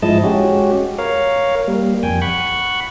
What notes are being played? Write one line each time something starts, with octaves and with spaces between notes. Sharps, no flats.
G#2 F3 G#3 E4 D#5 A5
G#3 C#4 F#4 G4
A#4 C#5 F5
G3 A#3
F2 G5 G#5
F#5 B5 C#6